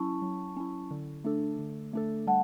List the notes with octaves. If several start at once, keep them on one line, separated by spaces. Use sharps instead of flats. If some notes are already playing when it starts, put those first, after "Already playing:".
Already playing: F#3 C#4 E4 A5 C#6
F#3
C#4 E4
D3
A3 D4 A4
D3
A3 D4 A4
G3 F#5 A5